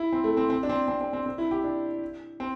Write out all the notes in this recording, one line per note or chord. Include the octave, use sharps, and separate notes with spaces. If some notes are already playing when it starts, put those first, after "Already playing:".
Already playing: E4
C4
A3
C4
C4
D4
C4
C4
C4
C4
C4
E4
G4
D4
C4